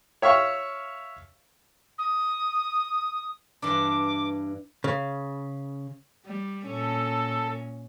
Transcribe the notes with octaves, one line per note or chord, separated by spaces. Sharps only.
C#5 E5 F5 C#6
D#6
G2 E3 D4 D6
C#3
G3
A#2 C#4 A4